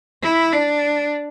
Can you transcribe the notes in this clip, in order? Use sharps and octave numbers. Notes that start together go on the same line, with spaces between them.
E4
D4